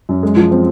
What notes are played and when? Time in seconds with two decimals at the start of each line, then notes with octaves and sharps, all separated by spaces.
0.09 F#2
0.23 G#3
0.36 F3
0.51 C4